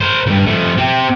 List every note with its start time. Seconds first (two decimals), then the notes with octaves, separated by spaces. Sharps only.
0.01 A#4 C5
0.27 D2 G2
0.47 F3 A3
0.77 C4 G4